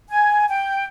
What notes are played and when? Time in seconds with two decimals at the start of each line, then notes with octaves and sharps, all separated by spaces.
0.09 G#5
0.48 G5